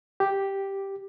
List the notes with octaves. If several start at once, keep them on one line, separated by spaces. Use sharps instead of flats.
G4